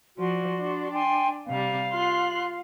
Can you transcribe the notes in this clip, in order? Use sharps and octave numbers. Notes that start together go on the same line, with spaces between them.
F3 F#4 D5 C6
D4
G5 G#5 C6
C3 G3 F5
F4 C6 F#6